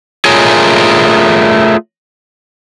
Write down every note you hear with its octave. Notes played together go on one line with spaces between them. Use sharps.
A3 F4 G#4 A#4 C#5 G#5